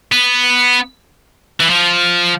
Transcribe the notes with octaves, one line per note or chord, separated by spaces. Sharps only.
B3
E3
F3